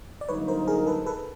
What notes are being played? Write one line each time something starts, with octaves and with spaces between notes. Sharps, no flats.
D5
G2 D3 F#3 A#3 D#4 B4 C#5
A#4 C5
G#4 A#4
A4 B4
A4 B4